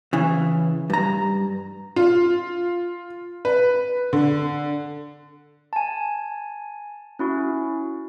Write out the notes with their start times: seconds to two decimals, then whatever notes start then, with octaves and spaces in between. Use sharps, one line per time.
0.13 C#3 E3
0.90 G2 A#5
1.96 F4
3.45 B4
4.13 D3
5.73 G#5 A5
7.19 C#4 E4 F#4